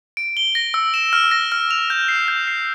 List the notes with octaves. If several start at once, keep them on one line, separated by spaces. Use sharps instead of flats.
D7
G7
A#6
E6
E7
F6
A#6
F6
F7
G6
C7
G6
C7